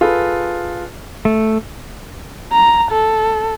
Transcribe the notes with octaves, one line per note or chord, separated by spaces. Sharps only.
F4 G#4 A4 B4
A3
A#5
A4